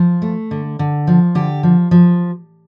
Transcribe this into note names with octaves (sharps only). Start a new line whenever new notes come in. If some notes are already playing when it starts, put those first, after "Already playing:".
Already playing: F3
A3
D3
D3
F3
D3 G4
F3
F3